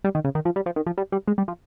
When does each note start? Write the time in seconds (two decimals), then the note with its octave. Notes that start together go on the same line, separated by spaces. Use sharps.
0.04 G3
0.15 D#3
0.24 C#3
0.35 D#3
0.45 F3
0.56 G3
0.66 F3
0.76 D#3
0.86 F3
0.98 G3
1.12 G3
1.28 G#3
1.38 G3
1.48 F3